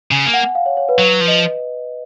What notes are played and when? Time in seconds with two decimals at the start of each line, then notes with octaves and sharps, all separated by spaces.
0.11 C#3 G#5
0.26 A#3
0.34 F#5
0.55 F5
0.66 C#5
0.77 C#5
0.89 B4
0.99 F#3 B4
1.21 F3
1.28 D#5